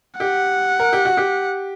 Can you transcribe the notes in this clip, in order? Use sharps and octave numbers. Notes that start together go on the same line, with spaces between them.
G4 F#5
A#4
G4
F#4
G4